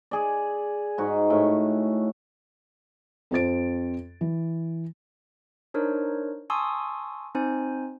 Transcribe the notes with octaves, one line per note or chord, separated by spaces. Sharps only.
G#4 D5
G#2 D#4 F#4
A2
F2 F4 C5 A6 D7
E3
D4 D#4 A#4 C5 C#5
G#5 A5 C6 C#6 D#6 E6
C4 D#4 C5 G#5